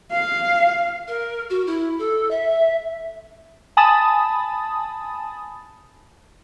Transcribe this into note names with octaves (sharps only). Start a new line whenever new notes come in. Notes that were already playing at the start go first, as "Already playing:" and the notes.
F5
A#4
F#4
E4
A4
E5
G#5 A5 B5 D#6 A6